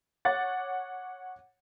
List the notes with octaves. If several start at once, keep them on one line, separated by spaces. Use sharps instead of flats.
C#5 F#5 D6 A6